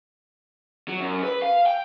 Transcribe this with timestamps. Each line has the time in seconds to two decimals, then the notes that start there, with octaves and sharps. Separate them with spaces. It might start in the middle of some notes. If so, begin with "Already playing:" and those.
0.88 F#3
1.00 F#2
1.23 B4
1.42 F5
1.66 G5